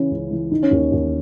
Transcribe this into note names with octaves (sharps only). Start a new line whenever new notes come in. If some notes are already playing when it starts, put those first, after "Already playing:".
Already playing: C#3 E3 C#4
C#2
E3
D#3 D#4
C#4
D#2 D#4
D#2